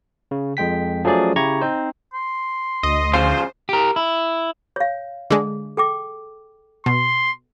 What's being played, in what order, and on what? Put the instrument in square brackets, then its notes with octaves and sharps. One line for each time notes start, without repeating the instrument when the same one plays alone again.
[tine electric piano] C#3
F2 G#3 G5 B6
F3 F#3 A3 C#4 G#4 D5
C#3 E4 G4 A#5 C#6 G#6
C4 D#4 C5
[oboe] C6
[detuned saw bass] D2 [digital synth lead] D#5
[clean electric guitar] C#3 F3 F4 [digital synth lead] C5
[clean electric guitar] G4 A#4
E4
[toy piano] C#5 F5
[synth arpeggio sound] D3 G#3 [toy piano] G#4
[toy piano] A4 G5 D6
[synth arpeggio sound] B2 [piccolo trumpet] C6